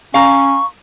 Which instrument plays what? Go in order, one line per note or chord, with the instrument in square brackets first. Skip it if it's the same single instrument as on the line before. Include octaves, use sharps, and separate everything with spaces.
[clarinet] C#4 [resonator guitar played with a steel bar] F5 A#5 [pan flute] C#6